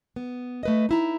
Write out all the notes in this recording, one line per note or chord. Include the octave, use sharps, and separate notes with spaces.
B3
A3 B4 D#5
D#4 E4 A#5